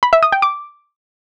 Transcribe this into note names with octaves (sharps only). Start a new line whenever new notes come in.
B5
E5
D#6
G5
D6